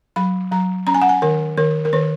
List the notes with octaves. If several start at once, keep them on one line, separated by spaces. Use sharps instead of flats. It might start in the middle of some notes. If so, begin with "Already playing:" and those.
F#3 B5
F#3 A#5
C#4 A#5
G#5
F#5
G#5
D#3 A#4
D#3 A#4
A#4
D#3 B4